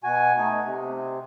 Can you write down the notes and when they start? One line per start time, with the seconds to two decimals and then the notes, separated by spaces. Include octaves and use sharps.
0.04 B2 F#4 G#5
0.38 A3 D#4
0.65 C3